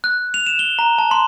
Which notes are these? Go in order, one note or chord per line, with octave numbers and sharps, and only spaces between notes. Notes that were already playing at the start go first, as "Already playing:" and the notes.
F#6
F7
E7
G7
A#5
A5
C6